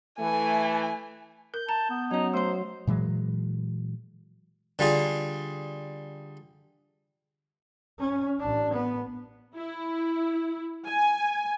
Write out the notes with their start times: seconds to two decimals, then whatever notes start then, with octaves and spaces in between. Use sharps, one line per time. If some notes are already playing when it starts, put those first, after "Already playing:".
0.20 E3 A3 G#5
1.54 A#4 G6
1.69 A5 A#5 G6
1.90 B3
2.11 F#3 C#4 D#4 D#5
2.34 F#3 A3 C5 C6
2.87 A#2 E3 F#3 G#3
4.79 D3 G3 F4 G#4
7.99 C#4
8.40 A1 D4
8.73 B3
9.55 E4
10.87 G#5